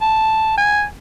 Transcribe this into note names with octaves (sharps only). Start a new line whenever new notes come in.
A5
G#5